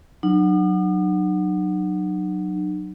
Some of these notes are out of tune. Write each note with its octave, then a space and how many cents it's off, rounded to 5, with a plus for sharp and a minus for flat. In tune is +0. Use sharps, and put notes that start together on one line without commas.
F#3 +0 D#4 -45